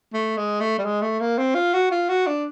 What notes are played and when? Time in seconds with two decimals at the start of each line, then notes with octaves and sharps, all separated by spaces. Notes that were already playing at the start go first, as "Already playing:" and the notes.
0.13 A3
0.37 G#3
0.60 A3
0.78 G3
0.85 G#3
1.02 A3
1.20 A#3
1.38 C4
1.55 F4
1.74 F#4
1.91 F4
2.09 F#4
2.27 D4